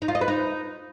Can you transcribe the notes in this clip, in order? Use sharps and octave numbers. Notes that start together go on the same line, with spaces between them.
D#4
F4
D#5
B4
D#4